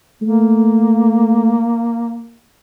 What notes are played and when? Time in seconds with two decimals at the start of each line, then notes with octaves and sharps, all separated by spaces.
0.22 A3 A#3